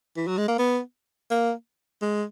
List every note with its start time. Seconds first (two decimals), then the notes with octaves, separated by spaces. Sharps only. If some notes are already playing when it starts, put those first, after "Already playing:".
0.16 E3
0.27 F#3
0.38 G#3
0.48 A#3
0.58 B3
1.30 A#3
2.02 G#3